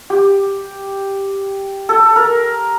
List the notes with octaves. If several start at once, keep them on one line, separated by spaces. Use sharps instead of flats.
G4
A4
A#4